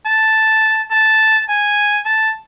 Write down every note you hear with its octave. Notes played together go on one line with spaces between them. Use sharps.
A5
A5
G#5
A5